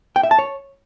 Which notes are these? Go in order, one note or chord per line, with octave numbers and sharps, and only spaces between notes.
G5
E5
A5
C#5